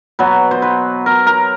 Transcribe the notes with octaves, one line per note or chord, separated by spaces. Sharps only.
B2 F#3 B4
C5
B4
A#4
A#4